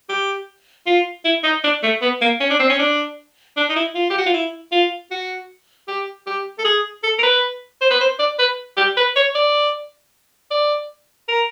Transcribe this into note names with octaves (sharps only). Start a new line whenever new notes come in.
G4
F4
E4
D#4
D4
A3
B3
A#3
C#4
D4
C4
C#4
D4
D4
D#4
E4
F4
G4
F#4
F4
E4
F4
F#4
G4
G4
A4
G#4
A4
A#4
B4
C5
B4
C5
D5
B4
G4
B4
C#5
D5
D5
A#4